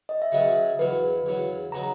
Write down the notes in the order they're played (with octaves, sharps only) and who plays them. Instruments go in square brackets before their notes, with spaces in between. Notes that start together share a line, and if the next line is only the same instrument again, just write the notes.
[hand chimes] D#5
E5
[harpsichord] C#3 F#3 C#4 G#4 B4 [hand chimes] D#5
[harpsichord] E2 C#3 F#3 [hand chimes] B4
[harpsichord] E2 C#3 F#3
[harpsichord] C#3 F#3 B3 D#4 [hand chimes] A#5